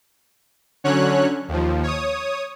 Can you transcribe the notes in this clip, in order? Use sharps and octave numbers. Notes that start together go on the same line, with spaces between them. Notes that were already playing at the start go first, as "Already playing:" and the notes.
D3 F#3 C#4 C#5 F#6
D#2 F3
C#5 D#6